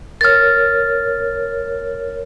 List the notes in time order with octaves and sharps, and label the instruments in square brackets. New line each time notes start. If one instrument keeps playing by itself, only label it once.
[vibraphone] A#4 C#5 [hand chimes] F6 A6